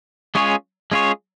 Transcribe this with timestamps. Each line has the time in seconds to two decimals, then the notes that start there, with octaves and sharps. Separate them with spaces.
0.35 G#3 C#4 F4 G#4 C#5
0.92 G#3 C#4 F4 G#4 C#5